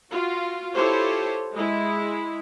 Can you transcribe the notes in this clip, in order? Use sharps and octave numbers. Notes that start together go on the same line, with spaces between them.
F4 F#4
E4 F4 G4 A4 C5 C#5
G#3 E4